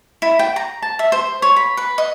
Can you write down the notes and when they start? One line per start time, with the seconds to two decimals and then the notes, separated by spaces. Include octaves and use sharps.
0.22 E4
0.39 G5
0.56 A#5
0.82 A5
0.99 E5
1.12 C5
1.42 C#5
1.56 B5
1.77 B4
1.98 D#5